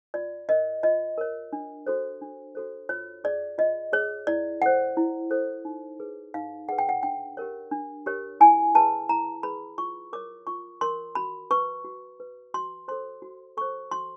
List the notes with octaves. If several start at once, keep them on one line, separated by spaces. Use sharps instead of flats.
F4 D5
A#4 C#5 D#5
F4 D#5
A#4 C#5
D4
F#4 A4 C5
D4
F#4 A4 C5
F4 C#5
G#4 C#5 D5
F4 D#5
G#4 C#5
E4 D5
A4 C5 F#5
E4
A4 C5
D#4
G#4 B4
D#4 F5
G#4 B4 F#5
G5
F#5
D4 G5
G4 A#4 C#5
D4
G4 A#4 C#5
E4 G#5
G#4 B4 A5
E4 A#5
G#4 B4 B5
F4 C#6
A#4 C#5 D6
F4 C#6
A#4 C#5 C6
F#4 B5
B4 C#6
F#4
B4
F#4 C6
A4 C5 C6
F#4
A4 C5 C#6
F#4 C6